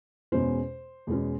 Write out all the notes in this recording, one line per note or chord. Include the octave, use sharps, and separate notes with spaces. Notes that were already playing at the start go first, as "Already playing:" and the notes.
E2 B2 G#3 C#4 C5
E2 B2 G#3 C#4